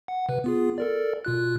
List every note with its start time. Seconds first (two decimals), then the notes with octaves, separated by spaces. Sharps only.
0.08 F#5
0.29 C3 B4
0.44 B3 F4 G#4
0.78 A4 A#4 D5
1.25 B2 F4 F#6